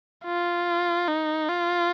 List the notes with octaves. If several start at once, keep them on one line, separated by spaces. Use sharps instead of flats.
F4
D#4
F4